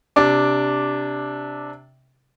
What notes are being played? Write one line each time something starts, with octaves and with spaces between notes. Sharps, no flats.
C3 D4 D6